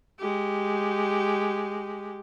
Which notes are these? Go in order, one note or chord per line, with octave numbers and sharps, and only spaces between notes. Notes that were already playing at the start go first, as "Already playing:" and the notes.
G#3 G4